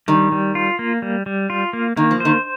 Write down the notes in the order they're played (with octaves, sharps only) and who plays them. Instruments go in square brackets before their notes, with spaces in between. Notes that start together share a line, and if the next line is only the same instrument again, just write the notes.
[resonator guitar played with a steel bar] D#3 [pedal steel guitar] G3
[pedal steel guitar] G3
F4
A#3
G3
G3
F4
A#3
[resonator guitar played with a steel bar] D#3 [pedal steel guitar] A#3
[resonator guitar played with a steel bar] F3
[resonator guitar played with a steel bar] D#3 [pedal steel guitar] C5